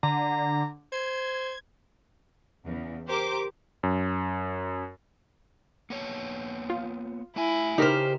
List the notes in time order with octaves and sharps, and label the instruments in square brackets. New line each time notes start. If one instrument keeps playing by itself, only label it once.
[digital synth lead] D3 [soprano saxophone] A#5
[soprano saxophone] C5 [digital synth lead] G#6
[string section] E2 C#3
G4 A#4 C5 D6
[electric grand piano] F#2
[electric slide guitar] A#3 B3 C#5
[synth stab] F4
[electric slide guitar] A3 E5 G#5 [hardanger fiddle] E4
[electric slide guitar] C#3 [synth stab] D#4 A#4 F6 [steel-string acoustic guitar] G4 C5